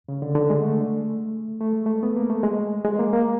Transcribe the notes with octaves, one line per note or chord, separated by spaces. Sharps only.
C#3
D3
D3
G#3
A3
A3
G#3
A3
B3
A#3
A3
G#3
G#3
A#3
A#3